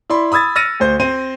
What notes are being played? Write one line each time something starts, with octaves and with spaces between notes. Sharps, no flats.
E4 D5 B5 C6
B5 D#6 E6 G#6 A6
E6 F6 A6 A#6 C#7 D#7
D2 C5 G6
C4 C5 D#7